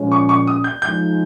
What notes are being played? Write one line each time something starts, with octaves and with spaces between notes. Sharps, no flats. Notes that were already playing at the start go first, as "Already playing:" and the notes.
Already playing: A#2 F3 G#3 C#4
C#6
C#6
D#6
G6
F3 G#3 D#4 G6